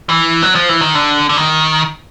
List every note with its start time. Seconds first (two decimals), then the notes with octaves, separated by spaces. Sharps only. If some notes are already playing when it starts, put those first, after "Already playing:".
0.09 E3
0.42 F#3
0.55 F3
0.69 E3
0.81 D#3
0.95 D3
1.29 D3
1.37 D#3